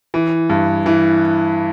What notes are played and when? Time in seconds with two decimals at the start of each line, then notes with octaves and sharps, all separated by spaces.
0.14 E3
0.50 G2
0.86 E3